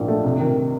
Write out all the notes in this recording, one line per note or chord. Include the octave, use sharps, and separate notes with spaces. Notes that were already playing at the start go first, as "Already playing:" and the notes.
Already playing: A#1 G#2 F3 A#3
A3
C3
D#3